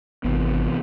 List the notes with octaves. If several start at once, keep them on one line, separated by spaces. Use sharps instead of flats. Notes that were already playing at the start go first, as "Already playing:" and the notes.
G#1 C3 E3 B3